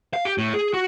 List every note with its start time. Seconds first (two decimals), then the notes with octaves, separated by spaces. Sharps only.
0.14 F5
0.25 G4
0.38 A2
0.54 G#4
0.74 F#4